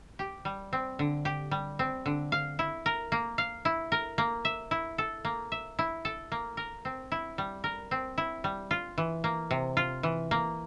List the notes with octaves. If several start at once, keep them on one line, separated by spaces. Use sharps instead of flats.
G4
G3
C4
D3
G4
G3
C4
D3
F5
E4
A#4
A#3
F5
E4
A#4
A#3
E5
E4
A4
A#3
E5
E4
A4
A#3
A#4
C4
E4
G3
A#4
C4
E4
G3
F4
E3
A#3
C3
F4
E3
A#3